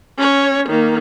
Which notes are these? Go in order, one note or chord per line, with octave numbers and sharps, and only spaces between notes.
C#4 C#5
D#3 A#3